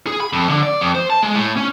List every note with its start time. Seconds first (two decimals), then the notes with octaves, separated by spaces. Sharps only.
0.07 G#4
0.20 B5
0.33 F2
0.49 D3
0.63 D5
0.81 F2
0.95 C5
1.10 A5
1.23 G#3
1.35 A2
1.57 C#4